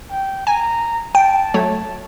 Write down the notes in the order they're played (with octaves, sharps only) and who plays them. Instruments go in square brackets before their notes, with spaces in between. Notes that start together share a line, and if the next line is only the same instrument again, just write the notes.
[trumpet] G5
[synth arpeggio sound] G#5 [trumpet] A#5
[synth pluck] G5 [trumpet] A5
[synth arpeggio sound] F#3 A3 C#5